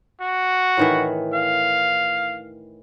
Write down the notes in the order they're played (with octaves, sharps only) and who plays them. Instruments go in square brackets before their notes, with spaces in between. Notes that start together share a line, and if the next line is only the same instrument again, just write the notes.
[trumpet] F#4
[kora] A2 D#3 E3
[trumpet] F5